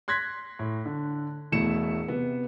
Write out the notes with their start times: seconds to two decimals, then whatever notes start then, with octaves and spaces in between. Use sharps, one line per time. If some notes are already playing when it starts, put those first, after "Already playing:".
0.08 C6 F#6 G#6 A#6 B6
0.59 A2
0.86 D3
1.52 E1 B2 A3 E4 C#7 E7
2.08 C3 B3